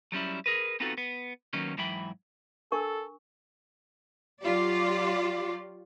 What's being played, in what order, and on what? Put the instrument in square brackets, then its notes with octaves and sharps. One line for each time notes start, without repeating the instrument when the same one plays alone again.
[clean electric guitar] F#3 G3 C#4 E4
G#4 A#4 B4
B3 C4 D#4 F4 F#4 A4
B3
D#3 F#3 A#3 B3 C#4 D#4
G#2 E3 F#3 E5 G5 B5
[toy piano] D4 A#4 C#6 [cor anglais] A4
[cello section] F#3 F4 G4 D5